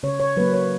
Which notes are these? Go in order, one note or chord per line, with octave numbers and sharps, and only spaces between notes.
C#3 C#5
C#5
F#3 A#3 B4
C#5